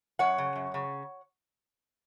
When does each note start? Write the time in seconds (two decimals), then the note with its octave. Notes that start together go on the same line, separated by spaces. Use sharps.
0.19 F#2 C#5 F#5
0.38 C#3
0.56 F#2
0.74 C#3